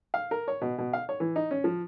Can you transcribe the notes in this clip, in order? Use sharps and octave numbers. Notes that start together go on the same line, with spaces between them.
F5
A#4
C#5
B2
B2
F5
C#5
E3
D#4
C#4
F3